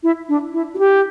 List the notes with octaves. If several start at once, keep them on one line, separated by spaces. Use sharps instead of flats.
E4
D4
E4
F#4
G4